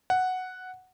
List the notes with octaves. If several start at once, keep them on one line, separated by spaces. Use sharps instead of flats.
F#5